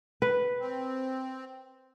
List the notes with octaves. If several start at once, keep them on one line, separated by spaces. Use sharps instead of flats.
B4
C4